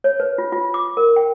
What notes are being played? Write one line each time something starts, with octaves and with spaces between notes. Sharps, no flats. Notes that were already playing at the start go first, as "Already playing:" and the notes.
C#5
B4
F4
F4
D6
A#4
G5